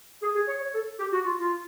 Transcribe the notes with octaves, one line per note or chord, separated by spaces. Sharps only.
G#4
G#4
C#5
C#5
A4
G4
F#4
F4
F4